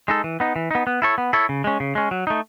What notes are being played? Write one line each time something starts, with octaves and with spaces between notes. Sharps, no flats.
G#3 D#4 A4
E3
B3 D#4
E3
B3 D#4
B3
E4 A4 C#5
B3
E4 A4 C#5
C#3
G#3 C#4
C#3
G#3 C#4
F#3
A3 D#4